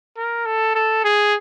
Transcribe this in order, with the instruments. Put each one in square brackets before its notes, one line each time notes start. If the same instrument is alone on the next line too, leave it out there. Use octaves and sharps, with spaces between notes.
[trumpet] A#4
A4
A4
G#4